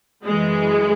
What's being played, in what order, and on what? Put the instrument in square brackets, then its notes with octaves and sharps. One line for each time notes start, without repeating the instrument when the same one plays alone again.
[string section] F#2 E3 G#3